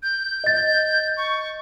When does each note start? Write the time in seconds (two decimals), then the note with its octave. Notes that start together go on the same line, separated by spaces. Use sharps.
0.03 G6
0.44 D#5 A6
1.17 C#6